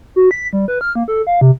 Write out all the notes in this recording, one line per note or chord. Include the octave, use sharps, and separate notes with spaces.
F#4
B6
G3
B4
F6
A#3
A4
F5
C3